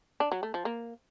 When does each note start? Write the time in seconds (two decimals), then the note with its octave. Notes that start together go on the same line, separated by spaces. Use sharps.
0.20 D4
0.32 F#3
0.43 A3
0.54 F3
0.65 A#3